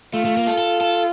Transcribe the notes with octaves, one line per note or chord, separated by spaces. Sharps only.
A3 F4
A3
A#3
A4
A4
A4